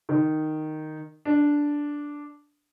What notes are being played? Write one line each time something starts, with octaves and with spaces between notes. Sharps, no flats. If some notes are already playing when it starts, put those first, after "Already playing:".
D#3
D4